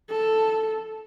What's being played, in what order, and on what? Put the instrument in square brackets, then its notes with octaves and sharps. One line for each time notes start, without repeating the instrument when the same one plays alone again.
[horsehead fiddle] A4